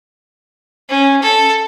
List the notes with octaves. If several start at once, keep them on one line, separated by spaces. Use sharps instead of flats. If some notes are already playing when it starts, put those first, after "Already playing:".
C#4
A4